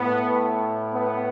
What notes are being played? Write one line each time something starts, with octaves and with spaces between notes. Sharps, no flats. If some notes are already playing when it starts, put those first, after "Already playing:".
Already playing: A2 B3
B3